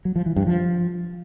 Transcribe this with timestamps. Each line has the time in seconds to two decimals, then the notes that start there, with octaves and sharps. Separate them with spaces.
0.05 F#3
0.16 F3
0.26 E3
0.36 G2
0.47 F3